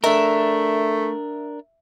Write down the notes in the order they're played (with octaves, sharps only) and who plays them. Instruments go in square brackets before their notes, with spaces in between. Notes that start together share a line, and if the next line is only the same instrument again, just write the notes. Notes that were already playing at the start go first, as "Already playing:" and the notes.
[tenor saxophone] A3 [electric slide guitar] D4 A#4 [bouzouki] E5